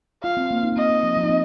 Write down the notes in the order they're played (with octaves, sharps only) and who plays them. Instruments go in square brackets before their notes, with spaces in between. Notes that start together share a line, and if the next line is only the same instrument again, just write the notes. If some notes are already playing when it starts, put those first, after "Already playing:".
[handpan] F4 [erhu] F5
[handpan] C4
A#3
D#4
A#3
[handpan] C4 [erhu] D#5
[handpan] A#3
F3
F3
D#4
C4